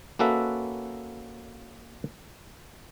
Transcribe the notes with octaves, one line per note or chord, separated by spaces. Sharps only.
A#3 C#4 F#4 A4 B4 E5